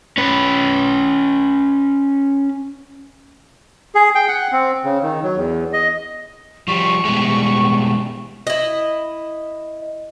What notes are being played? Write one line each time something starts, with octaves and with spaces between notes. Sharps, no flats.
C#4 B4
G#4
G5
F#5
C4
C#3
D#3
F#3
E2
D#5
F3 G3 C#6
B2 G3 G#3
E4 D#5